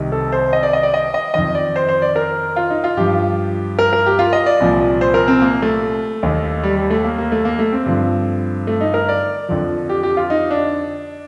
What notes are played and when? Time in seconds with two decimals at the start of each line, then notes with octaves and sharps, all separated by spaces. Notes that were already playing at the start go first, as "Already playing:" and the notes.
Already playing: C2 C3 D#3
0.12 A4
0.32 C5
0.53 D#5
0.63 D5
0.73 D#5
0.83 D5
0.94 D#5
1.14 D#5
1.34 F2 D#3 D#5
1.55 D5
1.76 C5
1.89 C5
2.02 D5
2.16 A#4
2.56 F4
2.70 D#4
2.84 F4
2.97 G2 F3 G4
3.79 A#4
3.93 A#4
4.06 G4
4.19 F4
4.33 D#5
4.46 D5
4.60 C2 A#2 F3
5.01 C5
5.14 A#4
5.28 C4
5.42 A#3
5.62 A3
6.23 D#2 D#3
6.63 G3
6.77 G3
6.90 A3
7.04 A#3
7.18 A#3
7.32 A3
7.45 A#3
7.59 A3
7.72 C4
7.86 G2 D3 F3
8.67 A3
8.81 D#4
8.94 A#4
9.09 D5
9.49 F2 D3 F3
9.89 G4
10.03 G4
10.17 F4
10.30 D#4
10.51 D4